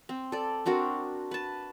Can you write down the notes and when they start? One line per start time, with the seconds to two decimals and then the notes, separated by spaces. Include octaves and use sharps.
0.09 C4
0.32 A4 D5
0.66 C4 D4 F#4 A#4
1.31 B4 A5